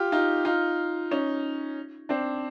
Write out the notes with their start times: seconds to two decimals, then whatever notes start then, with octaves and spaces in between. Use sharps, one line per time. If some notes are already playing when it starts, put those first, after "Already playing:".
Already playing: F4 G4
0.12 D#4 F4
0.45 D#4 F4
1.11 C#4 D#4
2.09 C4 D4